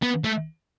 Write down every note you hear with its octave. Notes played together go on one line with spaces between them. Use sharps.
B3
A3